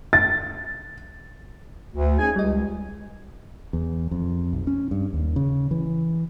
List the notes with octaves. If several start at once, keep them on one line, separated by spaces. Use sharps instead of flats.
A6
D2
C#4 D#4 G#4 G#5
C#2 G3 D#5
E2
F2
B1
C#4
G2
D#2
C#3
E3